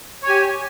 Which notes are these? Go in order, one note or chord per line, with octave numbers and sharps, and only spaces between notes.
G4 C#5 G#5